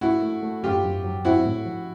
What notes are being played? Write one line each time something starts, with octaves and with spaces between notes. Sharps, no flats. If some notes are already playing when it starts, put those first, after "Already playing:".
A3 E4 F#4
A3
A3
F#2 F4 G4
F#2
F#3
C4 E4 F#4
A2
F3